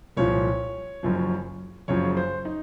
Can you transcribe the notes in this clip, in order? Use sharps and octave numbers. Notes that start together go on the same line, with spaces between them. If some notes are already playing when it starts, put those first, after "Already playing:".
C2 A#2 F3 C#5
F#1 F#2 F3
F#1 F#2 C#3 F3 C#5
C5
D#4